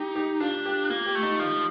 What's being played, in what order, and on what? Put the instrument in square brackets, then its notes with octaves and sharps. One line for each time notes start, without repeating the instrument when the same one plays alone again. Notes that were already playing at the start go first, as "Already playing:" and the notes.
Already playing: [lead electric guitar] D#4 [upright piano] G4
[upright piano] G4
[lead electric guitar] D4 [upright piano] F4
[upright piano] G4
[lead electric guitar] A#3 [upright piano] F4
[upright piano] G4
[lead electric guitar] A3
[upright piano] D#4
[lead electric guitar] F3 [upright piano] F4